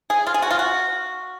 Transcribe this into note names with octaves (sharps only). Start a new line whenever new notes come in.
G#4
F4
G#4
F#4
F4
F#4